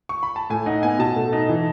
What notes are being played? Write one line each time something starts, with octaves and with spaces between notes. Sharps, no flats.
C#6
B5
A5
A2 G#5
D#4 F#5
B3 G#5
B2 A5
A3
D#4
E3